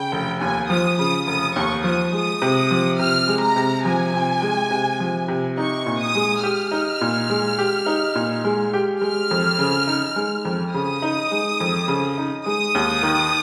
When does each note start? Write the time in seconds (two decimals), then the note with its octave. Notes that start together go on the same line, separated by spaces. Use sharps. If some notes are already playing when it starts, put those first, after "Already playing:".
Already playing: C#3 G5
0.12 F1
0.41 D#2 G#5
0.70 F3 D#6
0.98 C#3 D#6
1.27 F1 D#6
1.56 D#2 C#6
1.84 F3 D#6
2.13 G#3 D#6
2.42 C3
2.71 F3
2.99 C3 F6
3.28 G#3
3.42 A#5
3.56 C3
3.85 F3 G#5
4.14 C3
4.42 G#3
4.71 C3
5.00 F3
5.28 C3
5.57 D#4 C#6
5.86 A#2
6.01 D#6
6.15 G#3
6.43 G4 F6
6.72 D#4
7.01 A#2
7.30 G#3
7.59 G4
7.86 D#4
8.15 A#2
8.45 G#3
8.74 G4
9.01 G#3 F6
9.31 F2
9.59 C#3
9.87 D#4
10.16 G#3
10.45 F2
10.74 C#3 D#6
11.02 D#4
11.31 G#3
11.60 F2
11.88 C#3
12.18 D#4
12.46 G#3 D#6
12.75 D#2
13.03 D#3